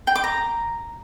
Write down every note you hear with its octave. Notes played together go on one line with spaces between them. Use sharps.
G5
D6
A#5